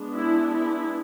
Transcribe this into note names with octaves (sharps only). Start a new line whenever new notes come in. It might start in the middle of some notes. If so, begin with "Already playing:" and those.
Already playing: G#3 B3 D4
E4
E4